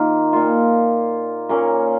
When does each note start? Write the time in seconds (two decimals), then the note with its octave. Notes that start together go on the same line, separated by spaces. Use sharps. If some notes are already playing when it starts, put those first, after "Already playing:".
Already playing: D#3 A#3 F4
0.33 A#2 A#3 F4
1.49 A#2 A#3 C#4